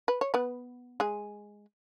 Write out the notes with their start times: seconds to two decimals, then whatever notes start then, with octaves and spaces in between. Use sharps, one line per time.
0.08 B4
0.21 C#5
0.34 B3 B4
1.00 G#3 G#4